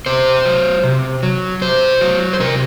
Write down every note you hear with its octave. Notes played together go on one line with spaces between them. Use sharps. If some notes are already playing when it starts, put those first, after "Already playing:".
C3 C5
F#3
C3
F#3
C3 C5
F#3
C5
C3 A#4